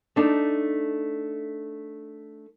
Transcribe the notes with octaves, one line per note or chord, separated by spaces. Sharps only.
A3 D4 D#4